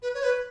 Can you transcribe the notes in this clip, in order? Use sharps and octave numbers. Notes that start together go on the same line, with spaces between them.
B4
C#5
B4